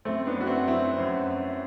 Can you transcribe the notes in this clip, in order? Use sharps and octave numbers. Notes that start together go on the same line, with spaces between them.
F#2 A3 C4
B3 D4
F#2 F#4
C4 E4
F#3 C4 E4
F#2